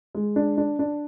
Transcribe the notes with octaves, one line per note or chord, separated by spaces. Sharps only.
G#3
D4
D4
D4